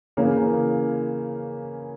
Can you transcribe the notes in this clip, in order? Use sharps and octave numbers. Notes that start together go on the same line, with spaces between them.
C#3 E3 A#3 C#4